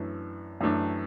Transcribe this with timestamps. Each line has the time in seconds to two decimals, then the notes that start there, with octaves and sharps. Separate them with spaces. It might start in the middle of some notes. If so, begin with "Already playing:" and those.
Already playing: F#2 E3 A3 D4
0.61 F#2 E3 A3 D4